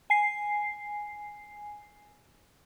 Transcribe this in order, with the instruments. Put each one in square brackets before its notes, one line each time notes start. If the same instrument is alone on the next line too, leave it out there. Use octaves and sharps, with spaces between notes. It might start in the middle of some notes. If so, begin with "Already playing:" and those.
[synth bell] G#5 C7